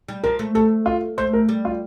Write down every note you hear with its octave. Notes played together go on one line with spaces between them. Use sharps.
G3
F3 A#4
A3
A3 A4
F4
A3 C5
A#4
G3
F4